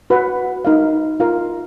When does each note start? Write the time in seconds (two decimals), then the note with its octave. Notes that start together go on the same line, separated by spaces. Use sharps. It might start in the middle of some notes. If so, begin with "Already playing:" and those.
0.10 F#4 B4 F#5
0.65 D#4 A#4 F5
1.20 F4 A#4 F5